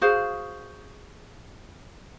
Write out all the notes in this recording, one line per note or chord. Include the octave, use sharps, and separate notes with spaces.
F#4 G#4 C5 F5